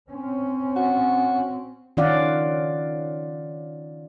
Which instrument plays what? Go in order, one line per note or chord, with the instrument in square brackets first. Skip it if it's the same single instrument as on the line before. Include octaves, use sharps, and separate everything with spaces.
[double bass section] C4 C#4
[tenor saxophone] F#4
[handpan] D#3 C#4 F4 D5 F5 F#5